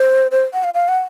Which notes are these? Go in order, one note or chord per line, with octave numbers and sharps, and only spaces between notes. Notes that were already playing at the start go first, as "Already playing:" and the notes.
Already playing: C5
C5
F#5
F5
F5
F#5